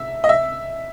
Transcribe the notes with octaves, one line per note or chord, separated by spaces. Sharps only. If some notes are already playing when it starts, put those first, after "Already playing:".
Already playing: E5
D#5
E5